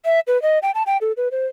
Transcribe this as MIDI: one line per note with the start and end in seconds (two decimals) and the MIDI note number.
0.05 0.20 76
0.27 0.40 71
0.42 0.59 75
0.62 0.71 79
0.75 0.83 81
0.86 0.97 79
1.01 1.12 69
1.17 1.28 71
1.32 1.46 72